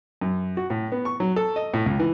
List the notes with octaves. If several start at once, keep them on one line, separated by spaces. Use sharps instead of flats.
F#2
F#4
A2
B3
C#6
F#3
A4
D#5
A2
C#2
E3